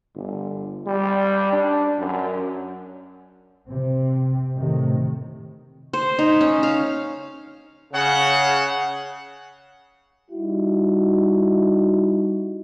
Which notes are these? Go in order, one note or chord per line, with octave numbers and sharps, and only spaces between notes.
G1
G3
D4
F#2
C3 C4
A2 C3 D#3
C5
D#4
C#4
F5
C#3 F#5
G3 D#4 E4 F#4